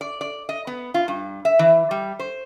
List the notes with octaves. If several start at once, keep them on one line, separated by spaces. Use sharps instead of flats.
D5
D5
D#5
B3
F4
G2
E5
E3
G3
C5